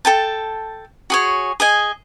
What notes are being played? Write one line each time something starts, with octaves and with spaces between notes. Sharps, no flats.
A4 G5 A5
F#4 G#4 C#5
G#4 D#5 G#5